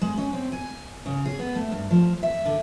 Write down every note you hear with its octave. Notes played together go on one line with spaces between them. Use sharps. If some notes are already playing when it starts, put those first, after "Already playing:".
G#3
C#4
C4
G#5
C#3
G#4
B3
A3
G2
F3
E5
D3